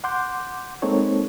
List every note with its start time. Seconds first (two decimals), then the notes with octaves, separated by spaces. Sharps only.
0.04 F#5 C6 D6 G6
0.82 G#3 A#3 C4 D#4 A4 C#5